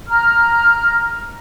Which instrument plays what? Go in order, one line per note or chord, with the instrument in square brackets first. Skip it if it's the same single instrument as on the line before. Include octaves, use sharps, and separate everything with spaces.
[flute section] A#5 F6